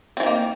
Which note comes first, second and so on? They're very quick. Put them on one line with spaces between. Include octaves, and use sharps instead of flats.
C4 E3 D#3 A#3